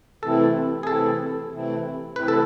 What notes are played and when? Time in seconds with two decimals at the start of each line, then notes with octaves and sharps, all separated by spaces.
0.23 C3 E3 A3 C4 E4 A4
0.83 G#4
0.87 C3 E3 A3 C4 E4 A4
1.52 C3 E3 A3 C4 E4
2.16 C3 E3 A3 C4 E4 B4
2.28 A4